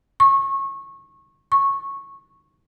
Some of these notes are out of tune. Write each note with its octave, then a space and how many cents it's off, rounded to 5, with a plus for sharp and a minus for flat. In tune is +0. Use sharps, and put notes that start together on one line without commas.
C#6 -25
C#6 -15